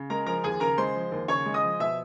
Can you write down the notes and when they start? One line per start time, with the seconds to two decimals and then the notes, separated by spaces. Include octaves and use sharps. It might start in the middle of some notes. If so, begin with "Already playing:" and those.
Already playing: C#3
0.10 G#3 A#4 A#5
0.26 F3 A#4 A#5
0.44 D#2 G#4 G#5
0.60 C#3 A#4 A#5
0.78 G#3 C5 C6
0.95 F3
1.12 D#2
1.28 C#3 C#5 C#6
1.46 G#3
1.54 D#5 D#6
1.63 F3
1.80 B2 E5 E6